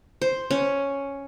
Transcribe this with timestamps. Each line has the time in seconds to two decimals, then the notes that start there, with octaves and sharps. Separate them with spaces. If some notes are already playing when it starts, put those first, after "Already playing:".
0.22 C5
0.51 C#4